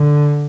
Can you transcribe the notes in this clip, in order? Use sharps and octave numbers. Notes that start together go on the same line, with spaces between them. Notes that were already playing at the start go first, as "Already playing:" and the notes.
Already playing: D3